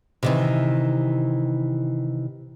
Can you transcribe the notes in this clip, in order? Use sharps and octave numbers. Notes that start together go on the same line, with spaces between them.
C3 D#3 E3